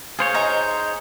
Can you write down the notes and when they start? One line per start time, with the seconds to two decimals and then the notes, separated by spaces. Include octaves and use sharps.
0.19 G#4 C5 C#5 F5
0.34 D#4 G#5 A#5